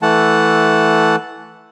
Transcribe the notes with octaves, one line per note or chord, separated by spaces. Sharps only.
E3 A3 F#5 A5